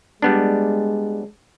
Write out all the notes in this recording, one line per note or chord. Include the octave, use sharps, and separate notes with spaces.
G3 G#3 B3 D4